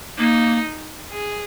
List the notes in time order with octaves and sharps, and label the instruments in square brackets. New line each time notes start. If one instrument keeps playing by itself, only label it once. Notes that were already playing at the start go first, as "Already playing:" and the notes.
[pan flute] A#3 [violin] D#4
[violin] G#4